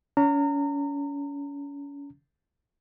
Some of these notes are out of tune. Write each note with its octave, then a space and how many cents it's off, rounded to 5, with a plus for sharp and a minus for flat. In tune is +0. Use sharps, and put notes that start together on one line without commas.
C#4 +35 A#5 -30